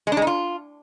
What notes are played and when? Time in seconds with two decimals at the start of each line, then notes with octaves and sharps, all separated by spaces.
0.07 G#3
0.12 D4
0.17 G#3
0.22 D#4
0.27 F4